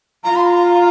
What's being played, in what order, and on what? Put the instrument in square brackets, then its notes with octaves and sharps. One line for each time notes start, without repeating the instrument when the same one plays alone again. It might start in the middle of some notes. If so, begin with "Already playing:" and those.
[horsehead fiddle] F4 [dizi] A#5
[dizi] C6
A#5